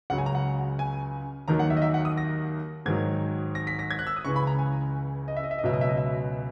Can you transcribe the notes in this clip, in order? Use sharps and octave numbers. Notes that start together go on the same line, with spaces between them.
C#2 C#3 F#3 F#5
G#5
A#5
F#5
G#5
D#2 D#3 F#3 A#5
F#5
E5
D#5
E5
F#5
D#6
A#6
G#2 D#3 F#3 G#6
A#6
B6
A#6
G#6
F#6
E6
D#6
C#2 C#3 E3 C#6
B5
A#5
G#5
D#5
E5
D#5
E5
D#5
C#2 B2 F#3 E5
D#5
E5
D#5
E5